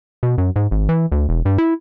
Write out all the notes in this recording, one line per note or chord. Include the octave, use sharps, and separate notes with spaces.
B2
F#2
G#2
G#1
E3
D2
E1
G2
E4